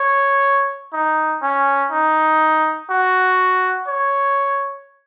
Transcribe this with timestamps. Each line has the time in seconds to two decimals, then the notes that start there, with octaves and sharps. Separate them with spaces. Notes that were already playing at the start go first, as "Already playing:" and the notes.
Already playing: C#5
0.93 D#4
1.42 C#4
1.91 D#4
2.90 F#4
3.87 C#5